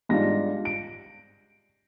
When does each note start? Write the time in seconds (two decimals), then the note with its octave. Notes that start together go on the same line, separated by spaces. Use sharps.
0.09 G#2 G3 D4 F4 A#6
0.65 D7